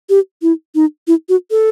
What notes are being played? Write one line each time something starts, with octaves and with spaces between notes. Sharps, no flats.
G4
E4
D#4
E4
F#4
A4